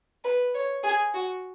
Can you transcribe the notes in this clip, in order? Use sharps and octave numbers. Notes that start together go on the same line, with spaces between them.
B4
C#5
G#4
F#4